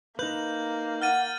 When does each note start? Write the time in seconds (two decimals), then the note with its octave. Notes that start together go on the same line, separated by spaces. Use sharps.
0.19 A#3 D#4 B4 G6 F#7
1.02 F#5 F6 A6 D#7